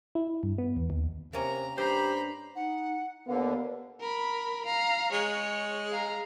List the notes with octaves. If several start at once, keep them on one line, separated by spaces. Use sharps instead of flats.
E4
G2
B3
E2
D#2
C3 A#3 C#4 A#5
G2 G4 C5 A#5 B5
D#4 F#5
D#2 D3 B3 A#4 F5
A#4 B5
F5 A#5
G#3 C#5
F5 A#5